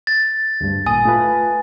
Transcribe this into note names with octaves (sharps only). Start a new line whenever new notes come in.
A6
D2 G2
G#1 A#2 G#5 D#6
A3 F4 B4